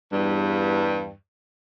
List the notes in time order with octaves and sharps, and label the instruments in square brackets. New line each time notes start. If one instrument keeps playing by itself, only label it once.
[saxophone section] E2 G2